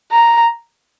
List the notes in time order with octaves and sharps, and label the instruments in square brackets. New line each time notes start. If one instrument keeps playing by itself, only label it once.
[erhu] A#5